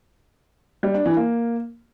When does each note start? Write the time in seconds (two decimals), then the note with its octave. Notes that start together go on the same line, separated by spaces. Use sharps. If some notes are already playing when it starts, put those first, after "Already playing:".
0.83 G3
0.94 D4
1.06 E3
1.17 A#3